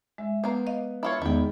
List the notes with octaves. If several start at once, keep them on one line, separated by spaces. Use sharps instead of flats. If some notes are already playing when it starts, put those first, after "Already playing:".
G#3 E5
A#3 B3 C5
D#5 F5
E4 F4 C#5
E2 D#3 G#3 E4 G5